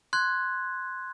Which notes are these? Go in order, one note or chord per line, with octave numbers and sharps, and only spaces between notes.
C6 F#6 G#6